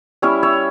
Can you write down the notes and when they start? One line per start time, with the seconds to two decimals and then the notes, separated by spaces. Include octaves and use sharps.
0.22 G3 C#4 E4 C#5 E5
0.43 C#5 E5